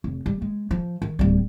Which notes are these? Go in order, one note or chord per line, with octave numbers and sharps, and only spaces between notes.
F1
G3
G#3
F3
D#3
D1 G3